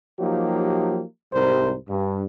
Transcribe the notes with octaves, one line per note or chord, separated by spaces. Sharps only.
F3 F#3 A#3 D#4 G4
C2 G#2 C3 G3 A#4 C5
G2